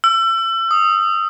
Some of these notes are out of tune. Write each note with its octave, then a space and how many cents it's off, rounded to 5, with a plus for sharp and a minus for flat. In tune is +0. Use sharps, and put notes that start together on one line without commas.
E6 +35
D#6 +5